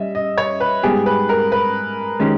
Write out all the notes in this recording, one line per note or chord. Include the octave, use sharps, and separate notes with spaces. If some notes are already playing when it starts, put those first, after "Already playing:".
Already playing: G3 C#4 D#5 E5
D#5
C#5
B4
G#2 G3 B3 G4 G#4
B4
A#4
B4
D#3 G#3 C#4 G4